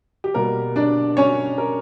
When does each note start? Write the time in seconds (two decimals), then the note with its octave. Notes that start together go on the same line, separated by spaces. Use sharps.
0.24 G4
0.34 B2 G3 A#3 A#4
0.76 D4 D5
1.17 C#4 C#5
1.58 A#4